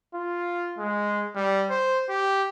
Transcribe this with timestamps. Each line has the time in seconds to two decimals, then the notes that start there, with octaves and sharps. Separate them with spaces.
0.15 F4
0.79 G#3
1.35 G3
1.70 C5
2.09 G4